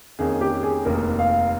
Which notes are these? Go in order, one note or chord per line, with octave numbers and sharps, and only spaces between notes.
F2 D#3 A#3 C#4 G#4
G4
G#4
F1 D#2 D#3 A#3 A#4
F5